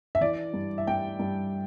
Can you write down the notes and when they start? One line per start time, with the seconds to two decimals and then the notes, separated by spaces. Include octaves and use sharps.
0.15 E5
0.21 E3 D5
0.54 G2
0.78 E5
0.87 G2 G5
1.20 G2